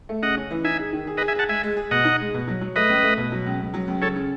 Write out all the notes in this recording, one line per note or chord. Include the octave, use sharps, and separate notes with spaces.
A3
C#3 D#5 F#5
C#4
E3
D#4 E5 G#5
G#4
D#3
G#4
B4 D#5
G#4
E5 G#5
G#4 F#5 A5
G#3 E5 G#5
G#3
G#4
B2 D#5 F#5
D#4
G#3
B2
F#3
F#3
A3 B4 D#5
C#2
A3
B2
F#3
C#2
C#2
F#3
C#2
C#3 A4 C#5
C#3